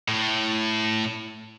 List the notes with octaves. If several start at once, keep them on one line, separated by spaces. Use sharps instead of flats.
A2